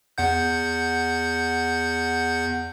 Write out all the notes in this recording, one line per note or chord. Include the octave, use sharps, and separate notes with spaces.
E2 F#5 G6